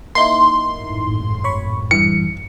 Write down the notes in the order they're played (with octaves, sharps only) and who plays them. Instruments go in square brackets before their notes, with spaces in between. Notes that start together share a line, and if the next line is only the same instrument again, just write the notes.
[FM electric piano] A#3 D#4 E4 [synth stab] C6
[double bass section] G#1 F#2 A2
[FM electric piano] C#5 B5 C#6
[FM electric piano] G2 E3 [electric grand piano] C#7